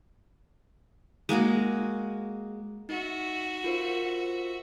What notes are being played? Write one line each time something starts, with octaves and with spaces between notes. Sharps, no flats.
G#3 A#3 F#4 G#4
D#4 F#4 E5
F4 A#4 C5